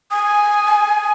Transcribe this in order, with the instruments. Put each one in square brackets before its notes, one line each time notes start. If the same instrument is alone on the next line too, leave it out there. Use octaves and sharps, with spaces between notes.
[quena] G#5 [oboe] D#6